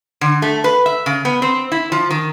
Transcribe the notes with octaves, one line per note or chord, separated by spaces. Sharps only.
D3
A3
B4
E5
C#3
B3
C4
E4
F3
D#3